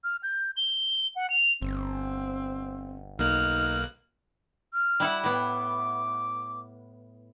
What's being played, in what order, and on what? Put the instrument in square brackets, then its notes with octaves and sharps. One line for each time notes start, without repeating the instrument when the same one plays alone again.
[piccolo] F6
G6
G7
F#5
F7
[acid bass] G1 [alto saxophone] C4
[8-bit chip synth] B1 A#3 F#6 [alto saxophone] D#4 [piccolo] F6
[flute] F6
[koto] G3 E4 F#5
[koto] A2 B3 [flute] D6